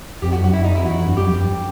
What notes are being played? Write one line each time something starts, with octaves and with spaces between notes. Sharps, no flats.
F2 G4
F#4
F#2
F#4
F#2 E4
D#4
F2
E4
E2 F#4
F2
G2
F#2 G4
F2
G2